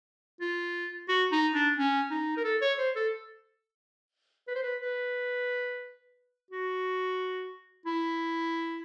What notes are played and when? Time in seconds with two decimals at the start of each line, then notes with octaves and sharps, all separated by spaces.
0.41 F4
1.09 F#4
1.32 D#4
1.54 D4
1.77 C#4
2.10 D#4
2.37 A#4
2.44 A4
2.61 C#5
2.79 C5
2.96 A4
4.48 B4
4.55 C5
4.63 B4
4.81 B4
6.51 F#4
7.86 E4